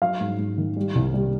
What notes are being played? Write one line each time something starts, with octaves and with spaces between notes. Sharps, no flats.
F#3 F5
G#2
G#2
D#3
G3
C2
G3